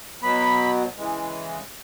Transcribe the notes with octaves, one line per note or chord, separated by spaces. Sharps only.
B2 F#3 B3 B5
C#3 E3 G#3